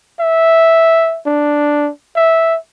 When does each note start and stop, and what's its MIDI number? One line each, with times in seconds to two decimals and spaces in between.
0.20 1.19 76
1.26 1.91 62
2.16 2.57 76